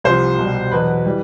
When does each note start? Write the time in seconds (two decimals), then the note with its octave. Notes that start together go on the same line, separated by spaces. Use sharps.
0.04 C2 C3 F3 C5
0.39 C2 B2 G3
0.71 E2 B2 F#3 B4
1.06 E3 G3